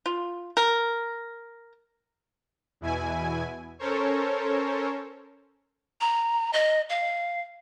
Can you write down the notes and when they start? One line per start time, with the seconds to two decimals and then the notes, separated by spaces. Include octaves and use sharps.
0.06 F4
0.57 A#4
2.81 E2 B2 E4 G#5
3.79 C#4 A4 A#4 C5 C#5
6.01 A#5
6.53 D#5
6.90 F5